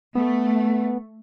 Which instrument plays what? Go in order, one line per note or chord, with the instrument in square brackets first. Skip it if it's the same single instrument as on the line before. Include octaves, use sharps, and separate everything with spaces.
[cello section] A3 [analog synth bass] B3